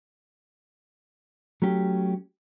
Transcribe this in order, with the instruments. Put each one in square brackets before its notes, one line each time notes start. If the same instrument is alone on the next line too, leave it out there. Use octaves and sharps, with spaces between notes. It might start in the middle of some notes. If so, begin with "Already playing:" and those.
[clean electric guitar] F#3 A3 C#4 G4